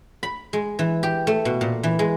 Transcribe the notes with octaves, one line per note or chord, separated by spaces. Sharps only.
B5
G#3
E3
G4
A3
B2
A#2
E3
G#3